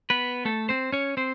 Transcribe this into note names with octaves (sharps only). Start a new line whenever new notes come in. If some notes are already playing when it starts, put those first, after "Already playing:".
B3 B4
A3 A4
C4 C5
C#4 C#5
C4 C5